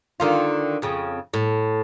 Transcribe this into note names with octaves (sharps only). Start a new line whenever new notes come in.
D3 D#3 F4
F2 C#3
A2